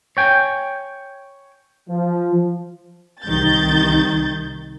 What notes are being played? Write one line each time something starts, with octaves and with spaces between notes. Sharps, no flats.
C#5 G5 G#5
F3
C2 D#3 G6 A6